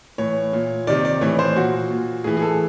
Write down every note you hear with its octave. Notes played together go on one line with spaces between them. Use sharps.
A2 E3 C#5
A#2
C3 D#3 D5
D5
A2 E3 C#5
C5
A#2 F#4
A#2
A2 E3 G#4
G#4
A4